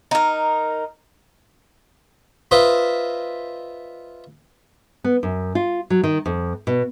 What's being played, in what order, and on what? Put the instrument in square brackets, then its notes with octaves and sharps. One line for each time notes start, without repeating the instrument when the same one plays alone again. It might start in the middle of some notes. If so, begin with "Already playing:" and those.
[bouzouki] D#4 A#4
[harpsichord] F4 B4 C5 D#5 E5
[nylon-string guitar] B3
F#2
F4
F#3
D#3
F2
B2